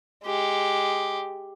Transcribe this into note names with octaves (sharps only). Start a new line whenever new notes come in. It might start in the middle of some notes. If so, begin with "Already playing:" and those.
G#3 G4